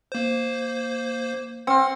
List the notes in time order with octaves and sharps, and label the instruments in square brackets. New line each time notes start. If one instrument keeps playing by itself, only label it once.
[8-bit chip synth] A#3 C5
[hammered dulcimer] C4 [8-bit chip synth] F#5 F6